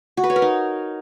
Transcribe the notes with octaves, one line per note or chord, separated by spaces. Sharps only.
F#4
B4
C#5
A#4
D#4